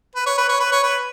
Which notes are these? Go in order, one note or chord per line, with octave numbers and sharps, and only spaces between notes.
B4
C#5
B4
C#5
B4
C#5
B4